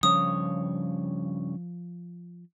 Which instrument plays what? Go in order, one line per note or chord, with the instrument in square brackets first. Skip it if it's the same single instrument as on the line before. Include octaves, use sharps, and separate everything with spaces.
[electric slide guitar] G2 C#3 C#5 [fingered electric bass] F3 [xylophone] D#6